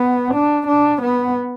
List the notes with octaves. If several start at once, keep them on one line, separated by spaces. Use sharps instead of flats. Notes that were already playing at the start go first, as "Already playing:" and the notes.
Already playing: B3
D4
D4
B3